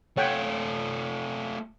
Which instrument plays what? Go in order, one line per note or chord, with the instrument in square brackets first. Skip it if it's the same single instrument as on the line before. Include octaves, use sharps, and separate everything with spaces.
[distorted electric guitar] A3 F4 [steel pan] C#5 F#5 G5